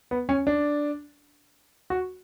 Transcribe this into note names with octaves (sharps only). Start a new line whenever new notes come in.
B3
C#4
D4
F#4